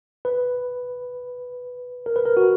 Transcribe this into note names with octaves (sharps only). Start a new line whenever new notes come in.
B4
A#4
B4
A#4
F#4